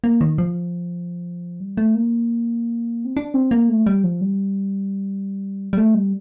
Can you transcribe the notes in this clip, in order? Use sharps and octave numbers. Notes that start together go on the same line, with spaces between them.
A#3
D#3
F3
G3
A3
A#3
C4
D4
C4
A#3
A3
G3
F3
G3
G3
A3
G3